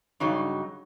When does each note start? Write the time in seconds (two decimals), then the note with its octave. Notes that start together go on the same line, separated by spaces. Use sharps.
0.20 G2 C#3 F#3 D#4